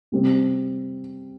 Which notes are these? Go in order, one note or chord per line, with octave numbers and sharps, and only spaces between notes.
C3 G3 C4